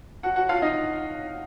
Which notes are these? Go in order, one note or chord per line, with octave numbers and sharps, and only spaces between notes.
F#4 F#5
F#4 F#5
F4 F5
D#4 D#5